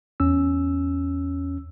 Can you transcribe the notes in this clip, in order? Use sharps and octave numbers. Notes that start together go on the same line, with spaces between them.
E2 C#4 E6